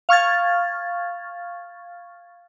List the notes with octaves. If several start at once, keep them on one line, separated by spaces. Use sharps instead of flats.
F5 C#6 F6 G#6 A6